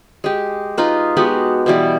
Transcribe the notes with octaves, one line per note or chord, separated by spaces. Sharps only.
G#3 G4
D#4 F4 B4
G#3 B3 F#4 G4
B2 E3 G3